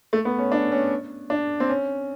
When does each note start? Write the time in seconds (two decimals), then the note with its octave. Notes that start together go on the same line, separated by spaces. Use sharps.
0.13 A3
0.25 B3
0.39 C#4
0.52 D4
0.72 C#4
1.30 D4
1.60 C4
1.69 C#4